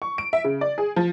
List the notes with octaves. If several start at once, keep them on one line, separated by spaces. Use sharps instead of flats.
C#6
D7
E5
C#3
D5
G#4
F3